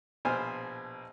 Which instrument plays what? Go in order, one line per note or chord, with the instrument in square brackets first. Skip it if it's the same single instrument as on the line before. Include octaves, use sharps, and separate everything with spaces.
[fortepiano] A#1 B2 C5 G#5 F6